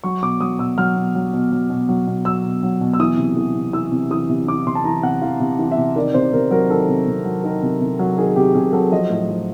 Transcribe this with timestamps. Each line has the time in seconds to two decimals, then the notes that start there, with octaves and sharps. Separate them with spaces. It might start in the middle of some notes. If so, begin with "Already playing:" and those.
0.04 F#3 C#6
0.22 B2 D6
0.41 F#3 D#6
0.59 B2 E6
0.78 F#3 F6
0.96 B2
1.15 F#3
1.33 B2
1.52 F#3
1.70 B2
1.89 F#3
2.07 B2
2.25 F#3 E6
2.45 B2
2.63 F#3
2.81 B2
2.94 E6
2.99 E3 D#6
3.18 C3
3.37 E3
3.56 C3
3.73 E3 E6
3.92 C3
4.11 E3 D#6
4.29 C3
4.48 E3 D6
4.66 C3 C6
4.75 A5
4.84 E3 A#5
5.03 C3 F#5
5.22 E3 F5
5.40 C3
5.59 E3
5.71 E5
5.78 C3
5.96 D#3 D5
6.14 C3 C5
6.33 C3 A#4
6.51 F#3 A#4
6.70 D#3 A4
6.88 C3
7.07 C3
7.25 F#3
7.44 D#3 A#4
7.63 C3
7.81 C3
7.99 F#3
8.17 D#3 G#4
8.36 C3 G4
8.55 C3 G#4
8.73 F#3 A4
8.92 F3 D#5
9.10 A2
9.29 F3